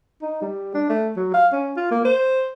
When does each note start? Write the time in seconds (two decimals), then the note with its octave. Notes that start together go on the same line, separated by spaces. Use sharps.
0.22 D#4
0.42 G3
0.74 D4
0.90 A3
1.16 F#3
1.34 F5
1.53 C#4
1.77 F4
1.91 A#3
2.05 C5